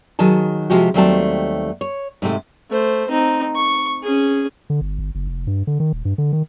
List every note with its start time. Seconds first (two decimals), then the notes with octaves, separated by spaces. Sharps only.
0.19 D#3 F#3 G#4 A5
0.70 C3 F3 G#3 F#4 G4
0.94 D#2 F#3 G3 A3 C4 A5
1.81 C#5
2.22 G#2 C3 A3
2.71 A3 C5
3.09 C4 D#4
3.56 C#6
4.03 C#4 G#4
4.70 D3
4.81 G1
4.99 G1
5.15 F#1
5.27 F1
5.47 G2
5.67 D3
5.80 D#3
5.93 D#1
6.05 G2
6.18 D3
6.33 D#3